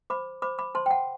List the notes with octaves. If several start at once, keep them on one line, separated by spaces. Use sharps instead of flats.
C5 B5 D6
C5 B5 D6
B5 D6
C5 A5 C6
G5
F#5 A5